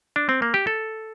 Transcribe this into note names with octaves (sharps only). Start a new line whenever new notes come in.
D4
C4
A#3
G4
A4